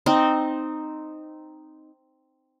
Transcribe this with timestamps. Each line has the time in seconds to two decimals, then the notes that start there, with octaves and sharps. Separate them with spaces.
0.06 C4 D#4